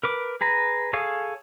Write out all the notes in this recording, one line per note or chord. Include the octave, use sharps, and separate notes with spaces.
A#4 B4 D6
G#4 B4 A#5
G#4 A4 C#5 F5 G#5